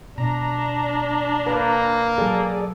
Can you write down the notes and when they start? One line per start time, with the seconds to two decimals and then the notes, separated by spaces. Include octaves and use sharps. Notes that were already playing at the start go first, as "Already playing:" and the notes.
0.18 B2 D4 A#5
1.47 A#3 B4 D5
2.18 F#3 G#4 A4 D5